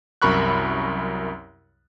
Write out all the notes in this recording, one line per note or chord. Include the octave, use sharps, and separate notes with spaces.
C2 F#2 A#4 B5 C#6 F#6